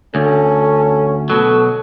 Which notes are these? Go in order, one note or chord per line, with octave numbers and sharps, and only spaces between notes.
D2 C#4 A4
B2 F#3 A4